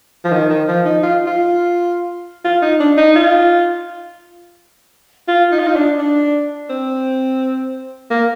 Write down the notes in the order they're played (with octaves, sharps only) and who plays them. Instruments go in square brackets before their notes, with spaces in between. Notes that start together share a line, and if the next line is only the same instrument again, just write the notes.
[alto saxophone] F3
D#3
D#3
F3
D#4
F4
F4
F4
D#4
D4
D#4
F4
F4
D#4
F4
D#4
D4
D4
C4
A#3